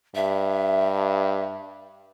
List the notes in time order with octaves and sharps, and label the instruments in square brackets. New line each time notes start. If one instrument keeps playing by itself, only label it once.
[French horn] G2 [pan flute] E5